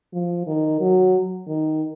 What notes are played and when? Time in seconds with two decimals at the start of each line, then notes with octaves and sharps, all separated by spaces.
0.13 F3
0.47 D#3
0.80 F#3
1.47 D#3